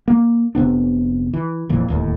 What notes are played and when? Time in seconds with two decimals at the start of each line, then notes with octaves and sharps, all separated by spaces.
0.08 A#3
0.55 F1 C3 B3 D4
1.33 E3
1.69 F1 F2 A#2 E3
1.88 D1 D#2 A2